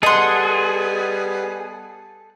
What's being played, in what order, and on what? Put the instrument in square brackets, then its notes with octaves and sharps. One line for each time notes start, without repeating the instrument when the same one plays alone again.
[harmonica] G3 B3 [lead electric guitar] G#4 [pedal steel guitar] A4 F#5 [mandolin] D#5 C6